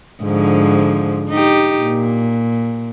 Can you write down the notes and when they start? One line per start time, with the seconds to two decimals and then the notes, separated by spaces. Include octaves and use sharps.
0.23 G#2 D3 F3
1.30 D#4 G4
1.82 A#2